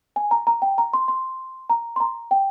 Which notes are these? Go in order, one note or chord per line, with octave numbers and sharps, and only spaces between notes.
G#5
A#5
A#5
G5
A#5
C6
C6
A#5
C6
A#5
G5